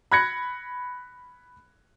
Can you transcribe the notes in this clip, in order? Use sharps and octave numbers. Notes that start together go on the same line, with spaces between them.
B5 F#6 G#6 A#6 C#7